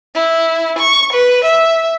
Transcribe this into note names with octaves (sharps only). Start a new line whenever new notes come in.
E4
C#6
B4
E5